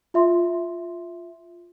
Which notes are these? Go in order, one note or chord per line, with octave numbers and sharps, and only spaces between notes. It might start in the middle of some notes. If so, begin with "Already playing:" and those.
F4 E5 C6